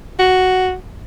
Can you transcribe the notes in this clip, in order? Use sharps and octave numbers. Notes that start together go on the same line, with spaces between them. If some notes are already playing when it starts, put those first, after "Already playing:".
F#4